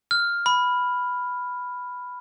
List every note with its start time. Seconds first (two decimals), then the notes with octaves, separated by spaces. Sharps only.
0.11 F6
0.46 B5